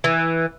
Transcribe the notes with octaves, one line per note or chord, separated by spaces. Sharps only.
E3